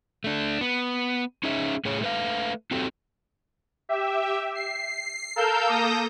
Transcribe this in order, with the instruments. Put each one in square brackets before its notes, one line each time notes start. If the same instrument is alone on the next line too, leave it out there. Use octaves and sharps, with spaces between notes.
[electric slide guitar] A3 D4
B3
C#4 D#4 G#4 E5
A2 G#4 C#5
A3 B4 F5
C4 F#4 G4 A4
[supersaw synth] G4 E5
C7
A4 A#4 F5 E6 G6
A#3 A4 D#6 G6 A#6